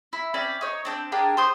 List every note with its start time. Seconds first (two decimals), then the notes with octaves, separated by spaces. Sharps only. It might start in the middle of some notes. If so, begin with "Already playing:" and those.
0.13 E4
0.34 C4 C#4 D5 B5
0.61 D#4 C#5
0.85 C4 D4 G6
1.12 D4 G4 G#4 A#4
1.37 C5 C6 D#6 G6